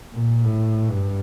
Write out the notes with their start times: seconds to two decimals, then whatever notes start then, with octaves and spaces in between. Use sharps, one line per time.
0.13 A#2
0.44 A2
0.90 G2